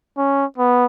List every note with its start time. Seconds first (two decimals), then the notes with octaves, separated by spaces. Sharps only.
0.17 C#4
0.58 B3